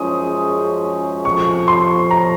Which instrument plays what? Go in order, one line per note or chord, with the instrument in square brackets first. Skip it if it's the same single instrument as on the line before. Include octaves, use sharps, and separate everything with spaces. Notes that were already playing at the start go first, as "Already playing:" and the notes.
Already playing: [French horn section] F#2 F3 G#3 C#4 G#4 [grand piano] D#6
[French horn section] F2 C3 F3 [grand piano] C#6
[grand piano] C6
A#5